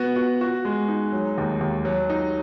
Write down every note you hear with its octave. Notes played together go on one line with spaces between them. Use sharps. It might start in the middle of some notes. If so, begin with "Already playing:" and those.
Already playing: B3 F#4
F#4
F#4
G#3
D#4
F#3
D#2
D#2
F#3
D#4